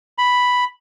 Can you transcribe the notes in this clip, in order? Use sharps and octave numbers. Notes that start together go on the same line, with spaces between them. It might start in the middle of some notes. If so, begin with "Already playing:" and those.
B5